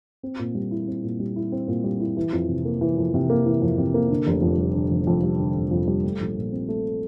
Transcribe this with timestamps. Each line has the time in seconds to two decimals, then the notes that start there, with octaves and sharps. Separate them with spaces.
0.23 C4
0.39 A#2
0.55 G3
0.71 E4
0.87 C4
1.04 A#2
1.20 G3
1.36 E4
1.52 C4
1.68 A#2
1.84 G3
2.00 E4
2.17 E3
2.33 F2
2.49 C3
2.65 A#3
2.81 E3
2.98 F2
3.14 C3
3.30 A#3
3.46 E3
3.62 F2
3.78 C3
3.94 A#3
4.11 D3
4.27 F1
4.42 F2
4.58 G3
4.75 D3
4.91 F1
5.07 F2
5.23 G3
5.39 D3
5.56 F1
5.71 F2
5.88 G3
6.04 A3
6.20 A#1
6.36 A#2
6.52 C4
6.68 A3